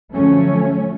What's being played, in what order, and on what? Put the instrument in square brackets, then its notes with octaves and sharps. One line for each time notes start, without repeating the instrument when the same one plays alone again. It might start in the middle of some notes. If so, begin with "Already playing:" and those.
[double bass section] D3 F3 F#3 A3 C#4